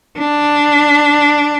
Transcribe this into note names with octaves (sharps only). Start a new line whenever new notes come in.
D4